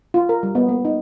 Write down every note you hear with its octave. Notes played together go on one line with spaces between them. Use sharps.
F4
A#4
G3
B3
A#3
D#4